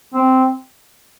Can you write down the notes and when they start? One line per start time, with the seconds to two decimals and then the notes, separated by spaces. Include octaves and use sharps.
0.14 C4